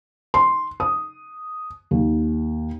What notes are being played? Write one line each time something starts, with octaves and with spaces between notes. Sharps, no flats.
C6
D#6
D#2